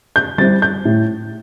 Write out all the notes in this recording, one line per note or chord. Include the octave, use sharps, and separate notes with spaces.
G6
G3 C4 E4 A6
G6
A2